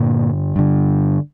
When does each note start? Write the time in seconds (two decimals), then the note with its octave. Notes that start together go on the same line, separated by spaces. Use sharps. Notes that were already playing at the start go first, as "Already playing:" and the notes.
Already playing: G2 A#2 D3 A#3
0.56 G2 D3